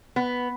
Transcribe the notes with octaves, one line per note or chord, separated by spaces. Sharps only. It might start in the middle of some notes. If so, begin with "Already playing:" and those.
B3